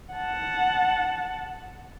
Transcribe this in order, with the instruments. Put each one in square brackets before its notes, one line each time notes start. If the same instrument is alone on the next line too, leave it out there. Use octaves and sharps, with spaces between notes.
[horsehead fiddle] F#5 A5